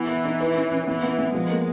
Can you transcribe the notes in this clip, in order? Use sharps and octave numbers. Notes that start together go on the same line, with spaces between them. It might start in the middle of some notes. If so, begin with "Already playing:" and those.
Already playing: E3 B3
B4
D#4
B4
C#4
C#4
E3 B3
B3
B3
F3 G#3
A#3